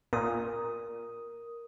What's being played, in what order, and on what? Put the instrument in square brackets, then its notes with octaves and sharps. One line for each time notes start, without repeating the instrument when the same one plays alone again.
[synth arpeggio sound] A#2 [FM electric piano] A#4 D#6